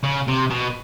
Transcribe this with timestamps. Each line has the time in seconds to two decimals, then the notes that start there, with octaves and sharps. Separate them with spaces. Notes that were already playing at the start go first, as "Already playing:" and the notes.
0.03 C#3
0.28 C3
0.50 B2